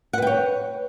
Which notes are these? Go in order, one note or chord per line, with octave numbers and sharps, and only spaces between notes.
B4 C#5 F#5 G5